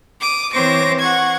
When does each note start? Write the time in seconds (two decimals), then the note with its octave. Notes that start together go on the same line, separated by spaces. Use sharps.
0.20 D6 D#6
0.52 E3 C4 C5 C#5 D6 A#6
0.99 F#5 C#6 G#6